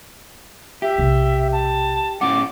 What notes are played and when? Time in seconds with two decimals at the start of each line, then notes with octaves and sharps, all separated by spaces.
0.82 G4 E5
0.98 B1 C3
1.52 A5
2.21 A2 C#4 F#5 D6